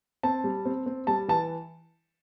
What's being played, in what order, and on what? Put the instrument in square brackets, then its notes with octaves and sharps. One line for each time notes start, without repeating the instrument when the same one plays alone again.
[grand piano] C4 A5
G3
C4
C4
G3 A5
E3 A5